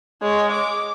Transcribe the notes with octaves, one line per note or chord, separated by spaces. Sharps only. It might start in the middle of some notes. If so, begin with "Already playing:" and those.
G#3 C#5
D6